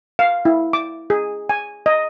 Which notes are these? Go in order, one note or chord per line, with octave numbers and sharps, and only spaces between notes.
F5
E4
D6
G#4
G#5
D#5